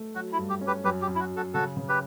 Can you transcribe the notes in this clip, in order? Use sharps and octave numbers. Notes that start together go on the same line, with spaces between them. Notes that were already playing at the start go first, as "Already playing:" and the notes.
Already playing: A3
F#3 F#4
E4
G2
G4
C#4
G4 B4
F#2 G4 B4
G4
F#2
E4
F#4
F#3
F#4 A4
C#3 F#4 A4
C#3
G4 B4